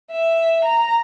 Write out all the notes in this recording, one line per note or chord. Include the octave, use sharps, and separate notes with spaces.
E5
A#5